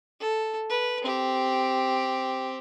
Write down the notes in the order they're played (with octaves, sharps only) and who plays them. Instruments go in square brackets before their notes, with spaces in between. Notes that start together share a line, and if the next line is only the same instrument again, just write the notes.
[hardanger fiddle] A4
B4
C4 G4